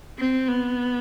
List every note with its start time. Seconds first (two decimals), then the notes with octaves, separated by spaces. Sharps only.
0.18 C4
0.48 B3